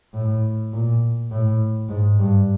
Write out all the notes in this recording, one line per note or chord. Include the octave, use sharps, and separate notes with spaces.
A2
A#2
A2
G#2
G2